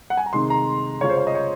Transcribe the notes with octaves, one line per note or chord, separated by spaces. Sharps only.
F#5
G#5
A#5
C3 D#3 G#3 D#4 C6
A#5
C#3 G#3 C#4 F4 C#5
C5
C#5
D#5
C#5